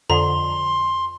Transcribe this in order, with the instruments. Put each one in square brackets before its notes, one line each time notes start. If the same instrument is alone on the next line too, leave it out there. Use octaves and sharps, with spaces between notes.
[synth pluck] F2 D3 [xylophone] A#5 [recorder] C6